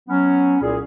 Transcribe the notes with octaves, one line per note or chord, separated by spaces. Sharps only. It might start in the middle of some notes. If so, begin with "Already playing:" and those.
F#3 B3 C#4
C2 A#2 G#4